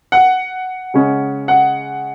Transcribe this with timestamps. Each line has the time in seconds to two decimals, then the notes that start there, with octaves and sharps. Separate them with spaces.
0.12 F#5
0.94 C#3 G#3 C#4
1.48 F#5